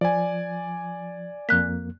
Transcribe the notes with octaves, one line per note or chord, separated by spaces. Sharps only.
F3 D5 G#5
F2 A#3 F#6 B6